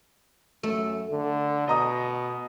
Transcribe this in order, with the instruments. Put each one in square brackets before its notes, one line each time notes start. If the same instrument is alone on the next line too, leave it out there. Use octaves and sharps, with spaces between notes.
[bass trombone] F#2 [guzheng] A3
[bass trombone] D3
[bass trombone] B2 [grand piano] D#5 A#5 D#6